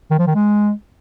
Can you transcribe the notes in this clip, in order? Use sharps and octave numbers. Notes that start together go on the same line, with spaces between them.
D#3
F3
D#3
G#3